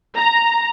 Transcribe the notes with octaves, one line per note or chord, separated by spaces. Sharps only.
A#5